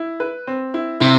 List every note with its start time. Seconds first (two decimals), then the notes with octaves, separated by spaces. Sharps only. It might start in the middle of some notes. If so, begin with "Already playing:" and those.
Already playing: E4
0.20 B4
0.47 C4
0.74 E4
1.00 C3 E4